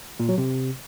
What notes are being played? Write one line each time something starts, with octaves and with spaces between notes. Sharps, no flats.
A#2
F#3
C3